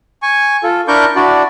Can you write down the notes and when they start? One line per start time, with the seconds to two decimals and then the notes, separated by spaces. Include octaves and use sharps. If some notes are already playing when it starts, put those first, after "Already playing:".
0.22 G#5 C#6
0.63 F4 A4
0.88 D4 E4 A#4 C#6 D6 G6
1.16 D4 E4 F#4 D5